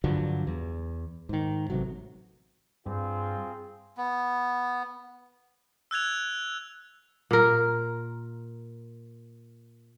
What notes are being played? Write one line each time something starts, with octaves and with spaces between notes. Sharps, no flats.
G2 D3 F3 F#3
E2
G#2 D#3
A1 C3 F#3
G2 C4 F4 G#4
B3
E6 F#6 G#6 F7
A#2 A#4